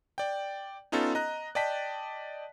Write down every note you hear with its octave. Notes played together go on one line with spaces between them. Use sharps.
D5 G5
B3 C#4 D#4 F4 A4
D#5 A#5 F#6
D5 D#5 G5 A5 B6